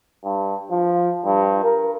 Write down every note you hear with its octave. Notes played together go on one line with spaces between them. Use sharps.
G2
F3
G2
A#4